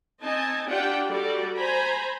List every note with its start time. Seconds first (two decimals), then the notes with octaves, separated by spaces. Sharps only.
0.20 C4 D#4 D#5 G#5 A5
0.67 D4 F4 G4 D5 F#5 G5
1.07 G3 F#4 A4 D5
1.56 C5 G#5 A#5 B5